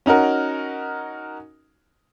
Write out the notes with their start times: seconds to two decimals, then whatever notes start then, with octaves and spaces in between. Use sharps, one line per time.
0.06 C#4 D#4 F#4 A#4